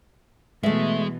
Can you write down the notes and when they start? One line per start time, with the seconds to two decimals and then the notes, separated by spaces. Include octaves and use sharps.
0.63 B2 E3 G#3 A3 E5